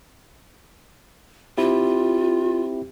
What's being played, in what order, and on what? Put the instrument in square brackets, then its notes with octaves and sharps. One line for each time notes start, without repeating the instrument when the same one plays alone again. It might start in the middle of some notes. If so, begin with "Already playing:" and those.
[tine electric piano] C4 E4 G4 [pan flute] F4